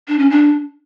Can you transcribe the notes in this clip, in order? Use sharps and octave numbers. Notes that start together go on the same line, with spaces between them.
D4
C#4
D4